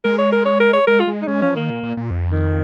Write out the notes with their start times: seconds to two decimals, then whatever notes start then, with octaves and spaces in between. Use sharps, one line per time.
0.04 G#3 A#4
0.18 C#5
0.32 A#4
0.46 C#5
0.60 A#4
0.73 C#5
0.87 G#3 A#4
1.00 F4
1.07 G#3
1.22 D#4
1.28 G#3 C#4
1.42 F3 C#4
1.55 D#3 A#3
1.70 A#2
1.83 A#2
1.97 A#2
2.11 F2
2.31 D#3